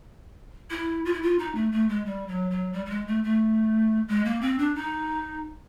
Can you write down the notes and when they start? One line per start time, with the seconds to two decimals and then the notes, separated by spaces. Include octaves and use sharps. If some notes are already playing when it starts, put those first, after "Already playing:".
0.70 E4
1.05 F4
1.13 E4
1.22 F4
1.39 D#4
1.55 A3
1.72 A3
1.89 G#3
2.06 G3
2.28 F#3
2.51 F#3
2.73 G3
2.86 G3
2.90 G#3
3.07 A3
3.24 A3
4.08 G#3
4.25 A#3
4.41 C4
4.59 D4
4.75 D#4